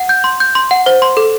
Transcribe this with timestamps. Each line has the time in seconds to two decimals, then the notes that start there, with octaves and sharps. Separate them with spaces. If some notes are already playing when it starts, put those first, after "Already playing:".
Already playing: F#5
0.09 G6
0.24 C6
0.40 G6
0.55 C6
0.71 F#5
0.86 C5
1.02 C6
1.17 A4